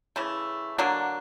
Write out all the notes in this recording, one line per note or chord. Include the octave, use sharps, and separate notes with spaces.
C#3 E3 A3
D3 F#3 A#3 D4